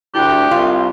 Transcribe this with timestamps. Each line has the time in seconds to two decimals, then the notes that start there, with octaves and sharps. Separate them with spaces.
0.15 D2 E4 G4 G5 F#6
0.51 C2 F4